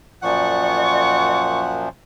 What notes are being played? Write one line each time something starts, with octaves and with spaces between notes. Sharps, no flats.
F#2 A#2 F3 D5 F#5 C#6